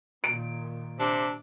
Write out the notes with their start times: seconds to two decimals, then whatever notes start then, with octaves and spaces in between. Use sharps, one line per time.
0.24 A#2 D#3 D7
1.00 C3 D4